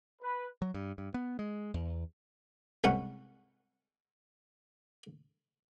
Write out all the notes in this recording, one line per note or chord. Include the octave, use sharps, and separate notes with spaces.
B4
F#3
G2
G2
B3
G#3
E2
C2 G#2 C#4 F#5